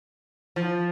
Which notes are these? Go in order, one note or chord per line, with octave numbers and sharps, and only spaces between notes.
F3